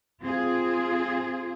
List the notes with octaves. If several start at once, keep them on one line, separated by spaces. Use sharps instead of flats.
C4 F4 G#4